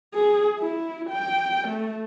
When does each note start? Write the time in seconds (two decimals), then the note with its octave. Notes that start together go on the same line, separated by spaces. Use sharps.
0.14 G#4
0.59 E4
1.09 G5
1.68 A3